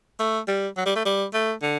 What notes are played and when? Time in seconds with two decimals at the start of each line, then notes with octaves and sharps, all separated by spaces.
0.20 A3
0.48 G3
0.77 F#3
0.86 G3
0.96 A3
1.06 G3
1.34 A3
1.62 D3